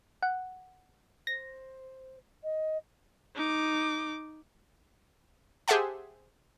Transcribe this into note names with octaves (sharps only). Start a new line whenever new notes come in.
F#5
C5 A#6
D#5
D#4 D6
G4 G#4 C5 E5 F#5 A5